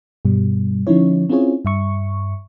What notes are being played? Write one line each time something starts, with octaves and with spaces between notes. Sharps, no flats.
G2 B2 G3
D3 F3 C#4 D#4 E4 C#5
C4 C#4 E4 F4 G#4 C#5
G2 E5 C#6